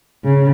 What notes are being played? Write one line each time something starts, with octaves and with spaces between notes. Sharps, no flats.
C#3